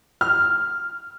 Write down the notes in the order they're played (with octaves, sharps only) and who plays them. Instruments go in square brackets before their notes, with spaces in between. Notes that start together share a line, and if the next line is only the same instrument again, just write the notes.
[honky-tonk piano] F6